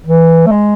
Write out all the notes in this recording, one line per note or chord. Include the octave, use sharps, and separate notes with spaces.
E3
A3
G#3